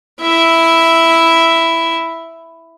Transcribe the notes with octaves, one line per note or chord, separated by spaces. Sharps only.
E4 E5